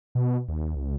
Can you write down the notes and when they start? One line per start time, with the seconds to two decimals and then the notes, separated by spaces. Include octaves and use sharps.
0.15 B2
0.49 D#2
0.76 C#2